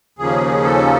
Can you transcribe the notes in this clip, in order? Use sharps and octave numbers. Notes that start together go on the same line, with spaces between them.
D#2 C#3 F3 A#3 C#4 G#4
A4